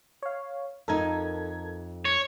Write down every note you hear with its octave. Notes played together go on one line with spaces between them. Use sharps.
C#5 F5
F2 D#4 A4 A#4 G#6
C#5